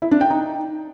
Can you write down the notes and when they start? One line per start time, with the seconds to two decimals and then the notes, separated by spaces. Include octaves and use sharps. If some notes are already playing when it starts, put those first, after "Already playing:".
0.02 E4
0.11 D4
0.21 G5
0.30 D#4